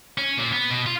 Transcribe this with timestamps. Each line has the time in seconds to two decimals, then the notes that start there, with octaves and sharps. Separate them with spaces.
0.18 C#4
0.37 A#2
0.53 B3
0.70 B2
0.86 F4